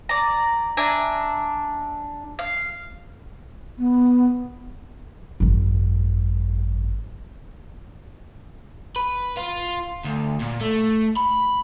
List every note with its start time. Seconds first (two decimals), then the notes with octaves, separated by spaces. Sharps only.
0.09 D5 A#5
0.77 D4 E5 G#5 A#5
2.39 F5
3.78 B3
5.40 G#1 F#2
8.96 B4
9.37 F4
10.05 D2
10.41 A#2
10.62 A3
11.16 B5